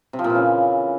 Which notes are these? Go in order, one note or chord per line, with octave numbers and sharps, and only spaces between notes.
C3
F3
A#2
E3
C#3